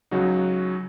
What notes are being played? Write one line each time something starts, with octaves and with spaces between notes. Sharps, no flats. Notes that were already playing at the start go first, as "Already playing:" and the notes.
C#2 C#3 F#3 D#4 F#4